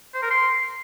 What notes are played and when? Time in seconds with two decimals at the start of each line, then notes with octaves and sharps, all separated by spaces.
0.14 C5
0.22 A#4
0.31 C6